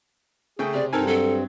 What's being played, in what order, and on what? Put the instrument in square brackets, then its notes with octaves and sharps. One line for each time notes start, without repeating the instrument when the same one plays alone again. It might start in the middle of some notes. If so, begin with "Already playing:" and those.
[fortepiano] C#3 A3 G5 [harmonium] G#4
[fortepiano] C3 [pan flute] D5
[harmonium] G2 C4 [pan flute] D#4 [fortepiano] A4 A#4 G#5
[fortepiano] F#3 [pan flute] A4